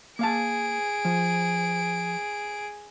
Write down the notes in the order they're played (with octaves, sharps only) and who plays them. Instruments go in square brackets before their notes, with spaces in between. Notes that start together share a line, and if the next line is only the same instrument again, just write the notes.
[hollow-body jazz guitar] A#3 F5 A5 [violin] G#4 D7
[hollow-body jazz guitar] F3